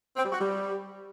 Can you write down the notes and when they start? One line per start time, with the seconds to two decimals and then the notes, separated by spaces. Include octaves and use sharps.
0.17 C4
0.25 G3
0.32 F#4
0.40 G3